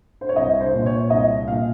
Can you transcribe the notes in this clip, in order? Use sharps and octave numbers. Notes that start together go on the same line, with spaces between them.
C5
C#5
C2 D#5
C5
A#2
C#5
C2 D#5
A#2 F5